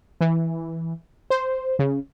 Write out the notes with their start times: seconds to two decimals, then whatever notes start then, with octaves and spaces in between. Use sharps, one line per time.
0.21 E3
1.30 C5
1.79 C#3